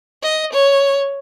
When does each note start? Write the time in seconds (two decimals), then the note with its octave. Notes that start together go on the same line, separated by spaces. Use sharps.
0.22 D#5
0.53 C#5